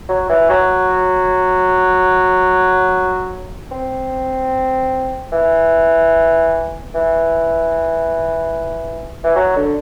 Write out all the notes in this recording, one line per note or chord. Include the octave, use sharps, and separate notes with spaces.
F#3
E3
F#3
C4
E3
E3
E3
F#3
D3